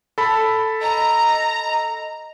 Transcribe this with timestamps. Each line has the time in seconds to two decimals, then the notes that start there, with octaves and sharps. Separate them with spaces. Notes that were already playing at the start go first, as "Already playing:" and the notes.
0.18 A4 A5 B5
0.81 D#5 A#5